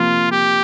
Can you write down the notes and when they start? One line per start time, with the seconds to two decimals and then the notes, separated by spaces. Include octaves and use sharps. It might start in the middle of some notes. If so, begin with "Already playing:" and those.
Already playing: C3 F3 A#3 F4
0.32 G4